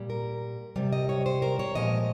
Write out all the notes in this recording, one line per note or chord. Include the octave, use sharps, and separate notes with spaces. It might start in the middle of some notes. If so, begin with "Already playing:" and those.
Already playing: A#2 G3
A#4
C3 G3
D#5
C#5
C5
A#4
C#5
A#2 F3 G#3 D#5